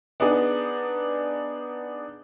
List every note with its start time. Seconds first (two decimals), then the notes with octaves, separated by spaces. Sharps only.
0.20 B3 D4 D#4 G#4